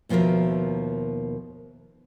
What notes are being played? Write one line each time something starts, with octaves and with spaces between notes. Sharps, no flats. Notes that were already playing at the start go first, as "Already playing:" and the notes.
D#2 B2 F3 F4 A#4 E5